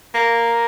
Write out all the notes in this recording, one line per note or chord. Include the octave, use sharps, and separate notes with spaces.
A#3